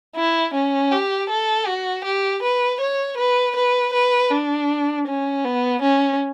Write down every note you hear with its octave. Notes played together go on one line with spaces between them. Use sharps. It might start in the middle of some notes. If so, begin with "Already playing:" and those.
E4
C#4
G4
A4
F#4
G4
B4
C#5
B4
B4
B4
D4
C#4
B3
C#4